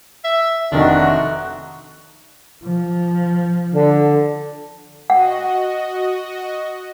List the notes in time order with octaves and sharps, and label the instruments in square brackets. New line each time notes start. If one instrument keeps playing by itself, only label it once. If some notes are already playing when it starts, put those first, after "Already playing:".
[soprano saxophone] E5
[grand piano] F1 D#3 [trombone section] A3 D#4 F#4 [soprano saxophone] D4
[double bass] F3
[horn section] D3
[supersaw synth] F#4 D#5 [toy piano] F#5